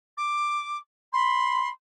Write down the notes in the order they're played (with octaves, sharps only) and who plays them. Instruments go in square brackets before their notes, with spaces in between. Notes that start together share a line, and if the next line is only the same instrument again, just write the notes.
[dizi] D6
[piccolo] B5 [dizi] C6